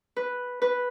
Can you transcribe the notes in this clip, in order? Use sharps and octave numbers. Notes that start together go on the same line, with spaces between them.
B4
B4